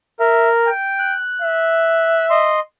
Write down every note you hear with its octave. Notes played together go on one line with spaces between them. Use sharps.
A#4 E5
G5
F#6
E5
D#5 C6